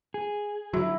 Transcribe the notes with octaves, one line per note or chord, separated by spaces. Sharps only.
G#4
D3 F#3 E4 F#4